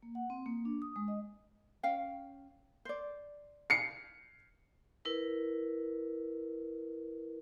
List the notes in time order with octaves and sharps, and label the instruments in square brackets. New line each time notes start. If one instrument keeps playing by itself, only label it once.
[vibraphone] A#3
F#5
C4
A#3
D4
D#6
G#3
D#5
[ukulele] C#4 F5 G5
C5 D5
[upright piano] C7 C#7
[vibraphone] E4 A#4 B4